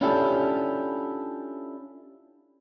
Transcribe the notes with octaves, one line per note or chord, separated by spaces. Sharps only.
C#4 D4 E4 F4 G4 A4